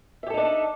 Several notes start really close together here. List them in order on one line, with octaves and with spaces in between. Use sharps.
E5 G4 A4 D#4 D4